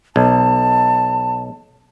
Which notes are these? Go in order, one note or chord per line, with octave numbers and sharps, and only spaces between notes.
B1 A5